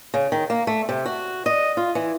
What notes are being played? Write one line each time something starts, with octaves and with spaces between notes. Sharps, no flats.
C#3
D#3
A#3
A3
C3
F#4
D#5
F4
E3